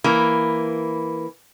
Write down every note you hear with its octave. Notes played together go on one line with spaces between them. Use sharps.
E3 A#3